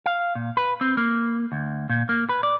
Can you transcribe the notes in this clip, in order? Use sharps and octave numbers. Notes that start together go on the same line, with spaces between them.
F5
A#2
B4
C4
A#3
D2
A#2
A#3
B4
D5